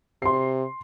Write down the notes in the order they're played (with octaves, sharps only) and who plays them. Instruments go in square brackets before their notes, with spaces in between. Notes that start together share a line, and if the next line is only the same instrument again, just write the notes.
[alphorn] C3 [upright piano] C6 C7